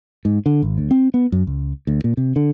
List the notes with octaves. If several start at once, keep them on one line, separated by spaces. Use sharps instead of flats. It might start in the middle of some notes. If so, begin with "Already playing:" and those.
G#2
D3
G#1
D2
C4
B3
F#2
C#2
D2
A#2
C3
D3